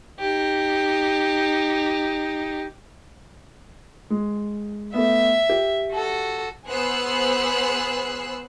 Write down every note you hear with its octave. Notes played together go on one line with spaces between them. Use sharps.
D#4 G4
G#3
A3 B3 E5
G4
F#4 A4
B3 G#4 C5 E6 F#6 C7